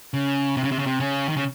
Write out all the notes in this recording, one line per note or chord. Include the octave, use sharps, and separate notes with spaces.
C#3
C3
C#3
C3
C#3
C3
C#3
D#3
C#3